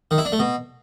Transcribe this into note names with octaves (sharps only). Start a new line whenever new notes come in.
D#3
E4
D4
A3
B2